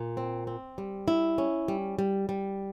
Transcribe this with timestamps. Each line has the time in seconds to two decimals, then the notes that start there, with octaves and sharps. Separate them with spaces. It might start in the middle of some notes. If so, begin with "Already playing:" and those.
Already playing: A#2
0.17 C4
0.47 C4
0.78 G3
1.08 E4
1.38 C#4
1.68 G3
1.99 G3
2.29 G3